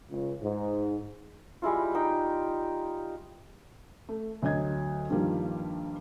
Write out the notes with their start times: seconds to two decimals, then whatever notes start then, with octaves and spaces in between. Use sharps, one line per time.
0.10 C#2
0.42 G#2
1.62 G3 G#3 E4 F4
1.95 D#4 G5
4.09 A3
4.42 D2 F#3 D#5 G#6
5.10 G2 D#3 F3 G3 A#3